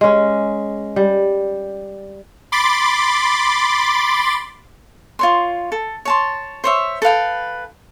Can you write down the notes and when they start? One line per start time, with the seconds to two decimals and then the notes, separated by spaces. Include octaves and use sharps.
0.01 G#3 C#4
0.96 G3
2.52 B5 C6 D6 A6
5.19 F4 C#5 C6
5.72 A4
6.05 C#5 A5 C6
6.64 C5 C#5 E5
7.02 A4 B4 F5 G5